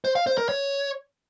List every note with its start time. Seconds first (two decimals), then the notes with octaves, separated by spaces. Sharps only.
0.05 C5
0.16 F5
0.27 C5
0.38 A#4
0.49 C#5